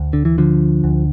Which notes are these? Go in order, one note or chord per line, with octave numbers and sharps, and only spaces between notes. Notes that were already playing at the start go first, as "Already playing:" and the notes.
Already playing: D2
D3
E3
D3 F3
D2